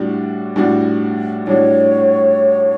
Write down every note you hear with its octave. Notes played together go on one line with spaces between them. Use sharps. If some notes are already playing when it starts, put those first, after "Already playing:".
Already playing: A2 G3 D4 F#4
A2 G3 D4 F#4
A2 G3 D4 F#4 C#5